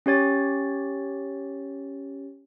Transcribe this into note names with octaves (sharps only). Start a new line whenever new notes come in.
C#4 G4 C#5 A6